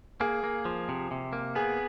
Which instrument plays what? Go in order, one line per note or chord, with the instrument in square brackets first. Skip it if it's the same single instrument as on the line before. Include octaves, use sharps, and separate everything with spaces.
[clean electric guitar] A#3 [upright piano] G#4
[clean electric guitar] A#3
F3
C3
C3
A#3
[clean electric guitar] B3 [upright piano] G#4